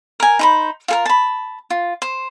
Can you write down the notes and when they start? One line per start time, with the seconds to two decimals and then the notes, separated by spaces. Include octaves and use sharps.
0.20 A#4 G#5
0.39 D#4 C5 B5
0.88 F4 A4 A#4
1.06 A5 B5
1.70 F4
2.02 C5